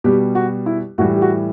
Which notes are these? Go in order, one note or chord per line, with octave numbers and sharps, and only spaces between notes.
B2 G3 G4
F#4
E4
A2 E3 G3 F#4
G4
F#4